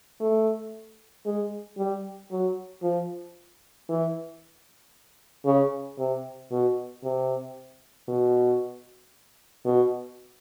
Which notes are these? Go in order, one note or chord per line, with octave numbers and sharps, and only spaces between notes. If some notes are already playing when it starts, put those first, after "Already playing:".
A3
G#3
G3
F#3
F3
E3
C#3
C3
B2
C3
B2
B2